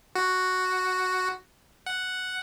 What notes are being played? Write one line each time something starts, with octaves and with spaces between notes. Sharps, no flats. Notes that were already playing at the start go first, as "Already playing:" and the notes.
F#4
F#5